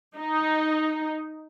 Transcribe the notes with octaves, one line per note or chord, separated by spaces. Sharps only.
D#4